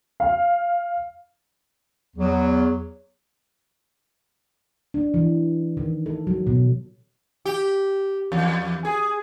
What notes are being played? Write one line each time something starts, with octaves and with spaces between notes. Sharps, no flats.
F5
E2 F#3
D4
E3
D#3
A4
F#3
B2
G4
E2
G#4